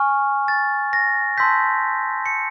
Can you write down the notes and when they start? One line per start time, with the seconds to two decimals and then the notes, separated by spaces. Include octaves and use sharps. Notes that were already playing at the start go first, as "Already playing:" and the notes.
Already playing: G#5 C#6 F6
0.48 A6
0.93 A#6
1.37 A5 C6 E6 G6 B6
2.26 C#7